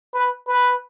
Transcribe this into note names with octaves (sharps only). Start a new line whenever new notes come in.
B4
B4